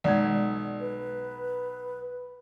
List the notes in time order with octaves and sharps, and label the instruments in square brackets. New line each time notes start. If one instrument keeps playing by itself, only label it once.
[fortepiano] B1 [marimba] G#3 D5
[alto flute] B4